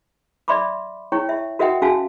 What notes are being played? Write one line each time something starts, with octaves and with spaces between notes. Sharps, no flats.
D5 E5 B5 C6 D6
E4 C#5 G5 C#6
E5
F#4 A#4 D#5 E5 F#5 G5
C#4 F#4 F5 G#5 A5